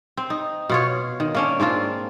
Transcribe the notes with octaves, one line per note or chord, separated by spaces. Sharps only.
C4
D#4
B2 F4 C#5
D#3
A#3 C#4 D4
G#2 C4 D4 F4